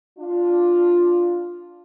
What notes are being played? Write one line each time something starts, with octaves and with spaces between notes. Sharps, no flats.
D4 F4